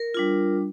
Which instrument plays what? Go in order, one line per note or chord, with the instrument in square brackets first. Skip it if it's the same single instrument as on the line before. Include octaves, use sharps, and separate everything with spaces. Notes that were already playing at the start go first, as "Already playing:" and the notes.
Already playing: [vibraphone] A#4
G3 D4 F4